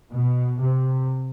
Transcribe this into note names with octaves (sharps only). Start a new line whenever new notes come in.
B2
C3